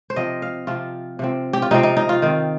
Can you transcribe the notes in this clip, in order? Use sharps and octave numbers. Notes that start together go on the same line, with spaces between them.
C5
C3 F3 C4 D#5
F5
C3 F3 C4 F4
C3 F3 C4
G4
F4
C3 F3 C4 D#4
D#4
D#4
F4
D#3 C4